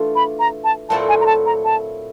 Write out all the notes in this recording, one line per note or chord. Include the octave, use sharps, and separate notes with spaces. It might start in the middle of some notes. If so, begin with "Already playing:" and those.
Already playing: E3 A3 D4 F4
B5
A#5
A5
A#2 F#3 A3 C4 E4 A5
G#5
A#5
A5
A#5
A5